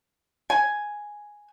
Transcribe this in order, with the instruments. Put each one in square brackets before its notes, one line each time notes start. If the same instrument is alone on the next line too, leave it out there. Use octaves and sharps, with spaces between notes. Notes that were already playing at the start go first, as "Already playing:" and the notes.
[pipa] G#5